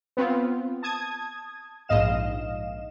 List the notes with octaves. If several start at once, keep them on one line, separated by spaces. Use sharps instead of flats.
B3 C4 F4
A5 D#6 G#6
A#1 G#2 D#5 F5 E7